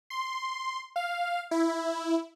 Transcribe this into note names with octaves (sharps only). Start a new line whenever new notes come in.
C6
F5
E4